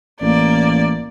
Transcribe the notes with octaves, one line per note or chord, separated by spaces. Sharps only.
A1 A#3 D5